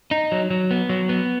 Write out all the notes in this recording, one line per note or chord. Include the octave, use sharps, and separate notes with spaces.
D#4
F#3
F#3
B3
F#3
B3